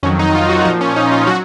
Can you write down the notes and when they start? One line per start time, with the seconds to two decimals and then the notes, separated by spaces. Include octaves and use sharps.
0.03 F2 D#3 F#3 C#4
0.19 D#4
0.35 F4
0.49 F#4
0.65 A#2 F3 D#4
0.81 C#4
0.96 D#4
1.08 D#4
1.12 F4
1.27 F#3 F#4